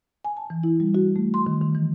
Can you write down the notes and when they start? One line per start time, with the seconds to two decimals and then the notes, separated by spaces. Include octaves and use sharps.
0.25 G#5
0.37 A5
0.50 E3
0.64 E4
0.80 G3
0.95 F#4
1.16 A3
1.34 C6
1.46 D#3
1.61 D#3
1.75 E3